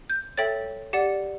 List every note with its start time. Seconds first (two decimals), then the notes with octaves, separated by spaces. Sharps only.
0.10 G6
0.37 A4 C#5 E5 G5 A6
0.93 G4 D5 F#5